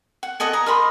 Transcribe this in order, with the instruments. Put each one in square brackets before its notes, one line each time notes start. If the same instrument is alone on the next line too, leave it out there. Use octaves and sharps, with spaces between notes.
[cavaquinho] F#5
A4 D#5 F#5 G#5
G#5 A#5
A#4 D#5 B5 C6